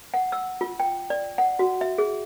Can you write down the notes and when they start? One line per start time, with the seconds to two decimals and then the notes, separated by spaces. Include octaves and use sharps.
0.14 F#5
0.32 E6
0.61 F4
0.80 G5
1.10 D5
1.38 F#5
1.59 F#4
1.81 E5
1.98 G#4